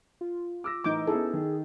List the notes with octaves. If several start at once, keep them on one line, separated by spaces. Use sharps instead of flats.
F4
D6 E6 A#6
A2 E3 D#4 D6 G6
B3 C#4 E4 G#4 A4
D#3